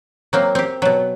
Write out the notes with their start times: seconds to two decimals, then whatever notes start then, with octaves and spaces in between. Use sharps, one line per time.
0.33 F#3 A#3 C4
0.55 C4 G4
0.82 B2 F#3